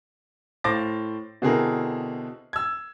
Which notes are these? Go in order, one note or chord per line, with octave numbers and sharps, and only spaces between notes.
A2 C5 F5 D6 A6 A#6
B2 D3 C4 E4 G#4 A#4
E6 G#6